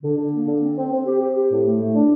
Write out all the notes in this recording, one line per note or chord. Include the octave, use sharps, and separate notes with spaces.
D3
D3
A#3
D3
C4
C4
C4
G4
G4
G4
A2
A3
A3
D4